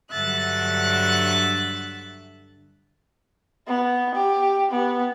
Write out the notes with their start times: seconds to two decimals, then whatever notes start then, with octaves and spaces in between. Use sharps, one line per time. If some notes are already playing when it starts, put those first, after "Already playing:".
0.10 G2 D3 F#3 E5 F#6 A6
3.67 B3
4.15 G4
4.71 B3